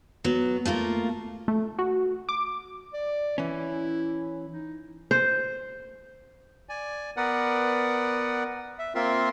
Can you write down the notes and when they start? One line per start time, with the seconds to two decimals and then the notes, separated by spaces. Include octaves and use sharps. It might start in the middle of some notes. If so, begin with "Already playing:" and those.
0.24 F#3 B3
0.65 A3 A#3 F4 A#4
1.48 A3
1.79 F#4
2.29 D6
2.94 D5
3.38 E3 C#4 E4
4.53 D#4
5.11 C5
6.69 D5 G#5
7.17 B3 A#4 B4 D5 F#5
8.79 E5
8.95 A#3 C4 F4 A#4 E5 C6